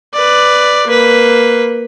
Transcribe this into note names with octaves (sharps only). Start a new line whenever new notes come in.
B4 D5
A#3 B4